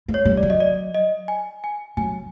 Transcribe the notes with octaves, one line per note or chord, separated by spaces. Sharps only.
G#3
C#5
G3
D5
F#3
D#5
D5
D#5
G#5
G#5
F#3 G#5